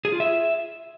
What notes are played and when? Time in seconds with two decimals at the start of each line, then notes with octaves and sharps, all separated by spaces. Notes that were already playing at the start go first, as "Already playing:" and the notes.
0.05 G#4
0.12 F4
0.20 E5